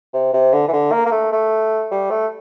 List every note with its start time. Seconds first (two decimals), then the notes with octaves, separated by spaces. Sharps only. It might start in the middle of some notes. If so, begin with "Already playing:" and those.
0.13 C3
0.33 C3
0.53 D3
0.68 E3
0.73 D3
0.92 A#3
1.06 A#3
1.11 A3
1.32 A3
1.91 G3
2.10 A3